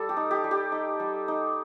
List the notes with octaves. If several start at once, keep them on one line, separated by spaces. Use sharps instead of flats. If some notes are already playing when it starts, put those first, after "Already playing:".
Already playing: G3 A4
G4
D#4
G4
G3
G4
D#4
G3
D#4